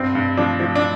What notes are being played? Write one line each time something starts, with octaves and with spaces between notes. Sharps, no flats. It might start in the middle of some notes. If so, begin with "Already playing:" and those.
Already playing: G2 C4
G2
F3 D4
F3
D4